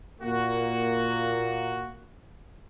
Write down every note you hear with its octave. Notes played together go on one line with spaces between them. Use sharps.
A#2 A#3 F#4